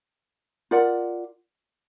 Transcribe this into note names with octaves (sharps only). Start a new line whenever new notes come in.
F4 A#4 D5 F#5